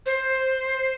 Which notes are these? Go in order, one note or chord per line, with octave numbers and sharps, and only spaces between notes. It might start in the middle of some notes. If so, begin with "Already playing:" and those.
C5